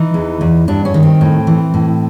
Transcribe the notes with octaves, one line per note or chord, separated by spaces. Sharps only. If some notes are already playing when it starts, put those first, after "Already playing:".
Already playing: E3 D#4
E2
E2
G2 D4
C#4
D#3
C4
A2
E3
A2